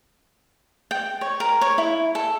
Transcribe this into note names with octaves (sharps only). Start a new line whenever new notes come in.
G5
C#5
A#4
C#5
E4
A4